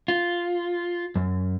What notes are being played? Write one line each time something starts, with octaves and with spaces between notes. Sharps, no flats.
F4
F#2